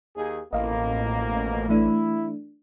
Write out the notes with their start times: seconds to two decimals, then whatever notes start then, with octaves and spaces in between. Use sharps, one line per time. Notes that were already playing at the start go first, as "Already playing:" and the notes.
0.16 D#2 G#4
0.53 A1 F2 B2 A#3 D#5 F5
1.69 E3 A3 D4 E4